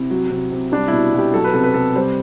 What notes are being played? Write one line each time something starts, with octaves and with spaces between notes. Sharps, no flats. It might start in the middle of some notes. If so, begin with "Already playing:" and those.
Already playing: C3 E4
F#3
C3
C3
G3 D4
B2 E4
B2 G4
F#3 A4
B4
C3 A4
B4
C3 A4
G3 C5